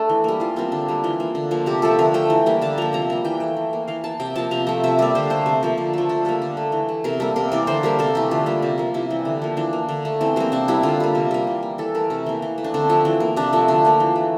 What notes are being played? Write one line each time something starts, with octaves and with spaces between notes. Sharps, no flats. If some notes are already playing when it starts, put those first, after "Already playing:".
Already playing: A3 D4 A4
E3
G3 A#3
E3 F4
G3 A#3 C4
D3 D4
G3 A#3
E3 F4
A#3
D3
F3 A#3
C3 G4
F3 A3 A4
D3 A#4
A3 G5
E3
G3 A#3
D3 A5
F3 A#3 A#5
C3 A#5
G3 A#3
E3 G5
A3 G5
E3
A#3
E3 F5
A#3 A5
C3 G5
F3 A#3 A5
C3 A#5
F3 A3 A#5
C3 E5
G3 A#3 D5
D3 C5
A3 C5
C3
F3 A#3
D3
F3 A3
D3 A4
G3 A#3 A4
D3
A3
E3
A3
C3 A#4
G3 A#3 A4
C3 A#4
E3 A#3 D5
D3 C5
G3 A#3 A#4
C3 A4
E3 A3 G4
D3 F4
G3 A#3
C3
F3 A#3
C3 E4
E3 G3
D3
F3 A#3
E3 D4
A#3
D3
A3
E3 C4
G3 A#3 C4
C3 D4
G3 A#3 E4
D3 F4
G3 A#3
C3
G3 A#3
E3
A#3
E3 A4
A3 A#4
C3 A4
E3 A#3
E3
A3
D4
D3 C4
F3 A3
E3
A#3
C3 D4
F3 A3
D3 D4
F3 A#3
E3
A3